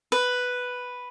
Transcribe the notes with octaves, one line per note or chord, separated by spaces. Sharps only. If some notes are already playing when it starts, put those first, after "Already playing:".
B4